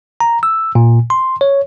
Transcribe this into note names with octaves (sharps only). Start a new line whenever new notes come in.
A#5
E6
A#2
C6
C#5